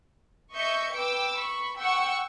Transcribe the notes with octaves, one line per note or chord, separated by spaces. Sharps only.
D#5 E5 C#6 G6 C#7
B4 G5 D6 E6
B5 C#6
F#5 G5 C#6 E6 C#7